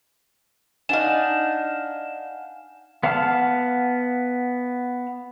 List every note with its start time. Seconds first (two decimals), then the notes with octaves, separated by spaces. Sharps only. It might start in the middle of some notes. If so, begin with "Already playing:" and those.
0.89 D4 D#4 F5 F#5 G#5 E7
3.03 B3 F5 F#5 A5 F6